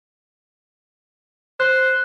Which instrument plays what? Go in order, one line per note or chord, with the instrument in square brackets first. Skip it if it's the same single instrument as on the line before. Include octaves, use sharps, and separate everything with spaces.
[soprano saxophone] C5 [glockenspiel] F#6